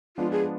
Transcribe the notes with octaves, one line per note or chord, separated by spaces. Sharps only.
F3 G#3 B3 D4 F4
G#4